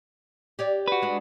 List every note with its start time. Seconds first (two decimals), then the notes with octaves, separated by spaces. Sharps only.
0.59 G4 C#5 D5
0.88 F#4 B4
1.02 G#3 D4